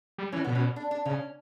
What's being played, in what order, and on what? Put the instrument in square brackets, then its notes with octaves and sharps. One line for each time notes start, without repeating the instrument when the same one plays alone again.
[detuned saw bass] G3
[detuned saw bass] E3 [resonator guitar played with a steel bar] C#4
[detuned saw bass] B2 [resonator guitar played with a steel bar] B3
[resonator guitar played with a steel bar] C#4
D4
D4
[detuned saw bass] C#3 [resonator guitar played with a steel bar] C#4